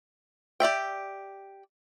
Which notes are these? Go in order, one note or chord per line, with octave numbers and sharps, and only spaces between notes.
G4 D5 E5 G5